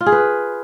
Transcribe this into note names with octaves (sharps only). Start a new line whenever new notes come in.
F4
G#4
B4